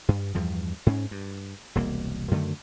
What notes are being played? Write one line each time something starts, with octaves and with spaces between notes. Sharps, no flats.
G2
E2 G2 F3
G#2 C#4
G2
E1 C2 A#3
F#2 D3 D#3 A3